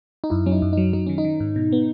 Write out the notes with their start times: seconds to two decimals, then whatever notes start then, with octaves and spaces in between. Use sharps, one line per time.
0.24 D#4
0.30 F#2 E4
0.46 F#3 C#4
0.52 D#4
0.62 F#2
0.73 F#3 D#4
0.93 F#3 D#4
1.06 D#3 C#4
1.18 D#4
1.24 D#3
1.40 G#2
1.56 B2
1.72 B3